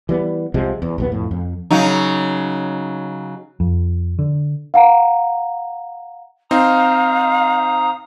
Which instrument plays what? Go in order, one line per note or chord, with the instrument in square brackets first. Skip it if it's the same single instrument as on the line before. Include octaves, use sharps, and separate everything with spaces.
[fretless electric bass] E3 G3 B3
C2 C3 F3 G#3
E2
A#1 D#2 B3
F2 A2
F2
[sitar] C#3 F#3 D#4
[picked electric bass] F2
D3
[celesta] F5 F#5 A#5
[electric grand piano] C4 D#4 [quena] F5 [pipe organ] A#5 D#6